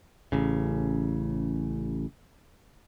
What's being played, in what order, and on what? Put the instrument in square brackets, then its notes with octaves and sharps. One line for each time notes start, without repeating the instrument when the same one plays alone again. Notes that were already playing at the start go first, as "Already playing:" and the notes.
[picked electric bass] A1 C#3